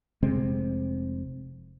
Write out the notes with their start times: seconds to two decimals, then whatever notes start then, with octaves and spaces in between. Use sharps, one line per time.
0.23 F1 C3 G#3 C4